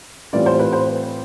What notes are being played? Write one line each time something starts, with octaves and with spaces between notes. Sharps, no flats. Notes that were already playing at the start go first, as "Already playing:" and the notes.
A2 E3 G3 C4 F4 D5
C5
B4
C5